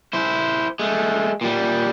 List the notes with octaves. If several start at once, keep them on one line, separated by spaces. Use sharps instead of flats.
E4 C5
G#3 A3
A#2 G3